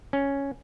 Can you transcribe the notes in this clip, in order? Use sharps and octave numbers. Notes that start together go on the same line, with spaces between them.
C#4